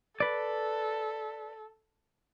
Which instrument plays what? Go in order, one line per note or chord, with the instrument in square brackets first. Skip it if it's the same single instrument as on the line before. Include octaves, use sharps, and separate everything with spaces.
[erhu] A4 [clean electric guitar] B4 D5